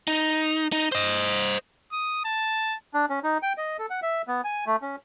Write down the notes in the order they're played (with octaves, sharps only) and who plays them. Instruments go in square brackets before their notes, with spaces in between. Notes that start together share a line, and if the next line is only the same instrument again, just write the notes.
[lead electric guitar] D#4
D#4
C5 D#5
[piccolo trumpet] D#6
A5
[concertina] D4
C#4
D#4
G5
D#5
A4
F#5
E5
B3
G#5
A3
C#4